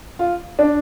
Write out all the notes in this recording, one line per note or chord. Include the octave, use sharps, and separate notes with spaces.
F4
D4